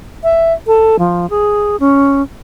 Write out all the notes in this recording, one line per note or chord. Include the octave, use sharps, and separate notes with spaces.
E5
A4
F3
G#4
C#4